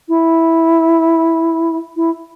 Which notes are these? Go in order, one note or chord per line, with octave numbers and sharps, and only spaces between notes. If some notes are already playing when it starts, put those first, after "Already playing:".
E4
E4